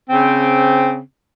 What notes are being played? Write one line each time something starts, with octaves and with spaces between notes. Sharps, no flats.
C#3 C4